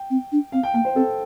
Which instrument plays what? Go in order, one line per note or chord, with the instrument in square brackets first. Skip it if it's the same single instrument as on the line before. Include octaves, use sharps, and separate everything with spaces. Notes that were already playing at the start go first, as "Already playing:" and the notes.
Already playing: [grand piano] G5
[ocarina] C4
D4
[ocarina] C4 [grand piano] F5
[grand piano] G5
[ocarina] A#3 [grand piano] G5
[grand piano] C5
[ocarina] C4 [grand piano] A4